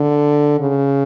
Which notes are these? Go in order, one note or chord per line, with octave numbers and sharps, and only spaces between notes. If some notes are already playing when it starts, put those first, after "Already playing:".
Already playing: D3
C#3